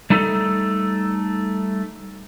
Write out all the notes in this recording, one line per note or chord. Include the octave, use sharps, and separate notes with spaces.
G3 A3 D#4 A4